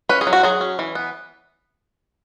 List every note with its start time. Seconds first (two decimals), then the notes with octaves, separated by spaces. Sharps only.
0.09 C#4 B4
0.21 G#4
0.27 F#3
0.33 F#4
0.43 F#3 G#4
0.61 C#4
0.79 E3
0.95 B3